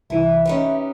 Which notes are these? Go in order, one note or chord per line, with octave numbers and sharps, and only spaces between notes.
C2 E3 E4 E5
C#4 D#4 G4 B4